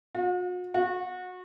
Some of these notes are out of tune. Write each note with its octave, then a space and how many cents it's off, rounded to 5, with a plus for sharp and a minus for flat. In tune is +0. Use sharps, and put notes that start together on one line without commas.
F#4 -45
F#4 -25